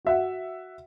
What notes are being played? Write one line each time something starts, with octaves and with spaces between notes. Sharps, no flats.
F#4 E5 F#5